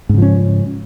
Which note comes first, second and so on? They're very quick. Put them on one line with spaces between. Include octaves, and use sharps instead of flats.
G#2 C#3 F3 C#4